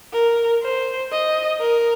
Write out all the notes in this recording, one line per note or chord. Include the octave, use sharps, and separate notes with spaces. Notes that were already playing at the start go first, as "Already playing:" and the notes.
A#4
C5
D#5
A#4